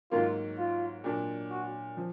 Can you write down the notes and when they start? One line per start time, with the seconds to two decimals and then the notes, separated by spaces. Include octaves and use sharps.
0.11 G#2 D#3 F#3 A#3 F4
0.58 F4
1.04 A#2 F#3 D4
1.50 F#4
1.97 F3